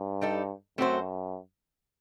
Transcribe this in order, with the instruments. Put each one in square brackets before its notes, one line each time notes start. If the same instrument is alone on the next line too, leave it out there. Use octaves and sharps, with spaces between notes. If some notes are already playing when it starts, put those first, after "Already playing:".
Already playing: [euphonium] G2
[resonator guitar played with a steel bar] G3 D#4 A4
[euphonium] F#2 [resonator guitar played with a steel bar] A3 C4 F#4 C5